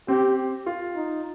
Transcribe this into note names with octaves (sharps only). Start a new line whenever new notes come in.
C4 G4
F4
D#4